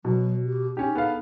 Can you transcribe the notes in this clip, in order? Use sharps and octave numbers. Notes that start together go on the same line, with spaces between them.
B2 F#3
G4
C#4 D#4 G4
B3 A4 F5